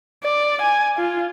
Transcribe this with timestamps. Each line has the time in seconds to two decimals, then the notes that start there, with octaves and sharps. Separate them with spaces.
0.23 D5
0.61 G#5
0.97 F4